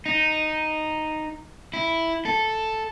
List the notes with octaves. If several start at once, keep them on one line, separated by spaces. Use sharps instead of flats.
D#4
E4
A4